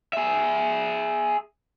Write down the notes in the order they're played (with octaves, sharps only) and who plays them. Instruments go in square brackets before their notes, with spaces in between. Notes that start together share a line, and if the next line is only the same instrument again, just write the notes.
[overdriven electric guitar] G#4 E5